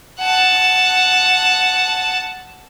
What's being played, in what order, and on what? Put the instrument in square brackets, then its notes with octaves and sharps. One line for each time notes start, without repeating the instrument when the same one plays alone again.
[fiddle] F#5 A5